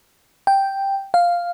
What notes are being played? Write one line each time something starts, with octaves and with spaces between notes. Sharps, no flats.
G5
F5